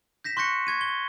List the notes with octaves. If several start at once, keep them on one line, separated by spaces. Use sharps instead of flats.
G6 A#6 B6 E7
C6 C#6 F#6 G6 A#6 C#7
C#6 G#6 D#7
G7